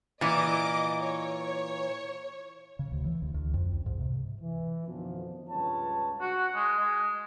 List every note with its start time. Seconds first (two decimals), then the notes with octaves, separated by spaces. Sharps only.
0.21 A#2 E3 D#5 D6
1.01 C#5
2.79 C#3
2.92 D2
3.04 E3
3.22 D2
3.34 D2
3.54 F2
3.72 C#2
3.86 G#2
4.00 C3
4.41 E3
4.87 F2 B2 D3 D#3 F3
5.49 C#2 G2 F4 B4 C#5 A5
6.21 F#4
6.55 G#3
6.79 G#3